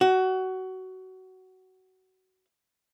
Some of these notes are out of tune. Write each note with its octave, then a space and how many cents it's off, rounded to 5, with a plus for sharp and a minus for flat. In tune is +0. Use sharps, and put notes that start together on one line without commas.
F#4 +20